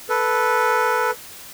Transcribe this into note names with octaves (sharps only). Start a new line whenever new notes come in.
A4 B4